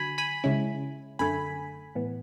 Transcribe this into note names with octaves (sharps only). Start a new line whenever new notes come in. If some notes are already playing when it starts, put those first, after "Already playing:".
Already playing: D3 F#3 G#5 B5
G#5 B5
C#3 G#3 C#4 E4
F#2 D3 A3 G#5 B5
A2 E3 B3